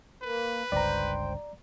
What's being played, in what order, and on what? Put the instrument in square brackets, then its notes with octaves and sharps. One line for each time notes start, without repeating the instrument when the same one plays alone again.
[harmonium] A#3 [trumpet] B4
[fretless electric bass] G1 C#2 G2 [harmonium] C5 G5 [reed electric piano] D5 A#5